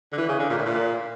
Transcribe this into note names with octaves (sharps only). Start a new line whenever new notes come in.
D3
E3
C#3
D3
A#2
A2
A#2